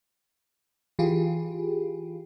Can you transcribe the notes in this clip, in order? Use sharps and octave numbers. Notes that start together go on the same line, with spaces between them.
E3 F4 G4 G#4